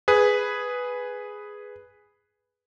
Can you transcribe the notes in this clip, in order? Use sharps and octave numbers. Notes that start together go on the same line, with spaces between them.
G#4 B4